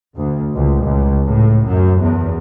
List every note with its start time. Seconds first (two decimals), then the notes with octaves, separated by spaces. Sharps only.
0.16 D2
0.55 C#2
0.84 C#2
1.27 A2
1.65 F#2
2.02 E2